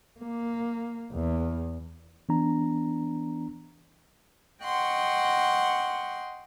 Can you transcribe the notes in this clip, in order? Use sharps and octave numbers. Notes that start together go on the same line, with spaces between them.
A#3
E2
E3 B3 D4 A#5
D#5 F#5 G5 C6 C#6